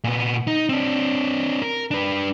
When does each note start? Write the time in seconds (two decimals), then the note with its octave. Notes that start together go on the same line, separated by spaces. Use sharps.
0.04 A#2 B3
0.47 D#4
0.69 C4 D4
1.62 A#4
1.91 D4 B4